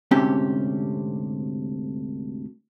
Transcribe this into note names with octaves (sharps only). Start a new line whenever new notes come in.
D2 G#2 C3 C#4 G4